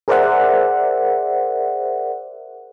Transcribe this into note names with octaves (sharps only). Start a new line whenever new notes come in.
G#4 A#4 C5 D5 E5 F#5